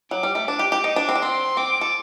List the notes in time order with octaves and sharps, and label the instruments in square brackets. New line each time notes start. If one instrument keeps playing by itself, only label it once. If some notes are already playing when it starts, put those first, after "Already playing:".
[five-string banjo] F#3 [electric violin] D6
[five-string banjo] G3
A3
[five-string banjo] D4 [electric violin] D6
[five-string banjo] G4
G4
D#4
D4
C4
D4
[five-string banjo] C4 [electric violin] C6
[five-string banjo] C4 [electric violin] D6
[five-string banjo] A4